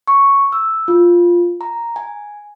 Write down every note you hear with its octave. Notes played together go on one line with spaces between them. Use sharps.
C#6
E6
F4
A#5
G#5